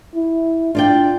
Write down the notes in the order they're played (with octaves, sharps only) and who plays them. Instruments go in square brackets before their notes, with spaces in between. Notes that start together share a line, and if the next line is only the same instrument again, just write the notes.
[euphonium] E4
[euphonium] D4 [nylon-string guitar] F4 D5 G5